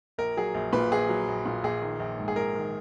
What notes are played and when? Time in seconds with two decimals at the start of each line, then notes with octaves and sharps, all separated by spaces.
0.18 A#1 A#4
0.37 F#3 G#4
0.54 A#1
0.73 A#2 B4
0.92 A#1 G#4
1.09 F#3
1.28 A#1
1.46 A#2
1.63 A#1 G#4
1.82 D#3
2.00 A#1
2.18 G#2
2.28 G#4
2.36 A#1 A#4
2.55 D#3